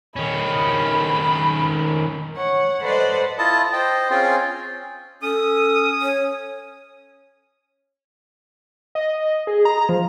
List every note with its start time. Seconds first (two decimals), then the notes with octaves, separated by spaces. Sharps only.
0.16 D#3 C#4 B5
2.36 C#5 F#5
2.81 A4 B4 C5 D5 D#5 F#5
3.39 E4 F4 D#5 A5
3.73 C5 D#5 G5
4.11 C4 C#4 F4 G#4 G5 C6
5.23 C#4 A4 D#6
6.01 C#5
8.95 D#5
9.47 G#4
9.65 A#5
9.89 F3